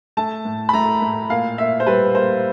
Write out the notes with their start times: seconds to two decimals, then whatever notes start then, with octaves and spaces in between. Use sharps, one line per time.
0.17 A3 A5
0.45 A2
0.69 B5
0.73 A3 A#5
1.02 A2
1.30 A#2 F5
1.58 A#2 E5
1.80 C5
1.87 G3 B4
2.15 A#3 C5